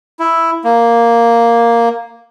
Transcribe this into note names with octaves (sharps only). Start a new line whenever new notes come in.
E4
A#3